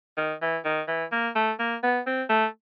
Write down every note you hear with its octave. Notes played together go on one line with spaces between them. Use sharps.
D#3
E3
D#3
E3
A#3
A3
A#3
B3
C4
A3